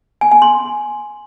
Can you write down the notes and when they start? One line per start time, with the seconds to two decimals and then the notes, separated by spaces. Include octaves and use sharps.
0.21 G#5
0.32 G#5
0.42 C6